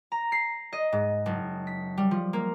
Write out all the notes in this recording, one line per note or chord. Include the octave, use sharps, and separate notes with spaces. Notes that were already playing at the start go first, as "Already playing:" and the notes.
A#5
C7
D#5
G#2
F#1
B6
G3
F3
A#3